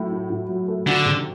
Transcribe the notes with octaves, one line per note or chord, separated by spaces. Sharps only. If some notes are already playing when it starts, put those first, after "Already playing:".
Already playing: A2 F#3 A3 E4
E4
A2
F#3
A3
D3 F#4
C3